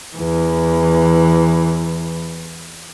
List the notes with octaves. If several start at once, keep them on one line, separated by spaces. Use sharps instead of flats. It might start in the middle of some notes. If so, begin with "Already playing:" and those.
E2 E3